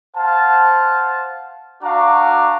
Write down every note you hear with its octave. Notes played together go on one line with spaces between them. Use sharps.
C5 F5 F#5 A5
D4 F#4 F5 A#5 C#6 D6